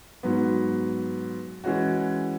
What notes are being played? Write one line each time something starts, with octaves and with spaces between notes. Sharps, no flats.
G#2 F#3 B3
E3 G#3 C#4 F#4